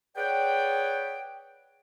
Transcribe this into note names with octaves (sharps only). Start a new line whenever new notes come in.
G#4 B4 C#5 D5 F#5 G5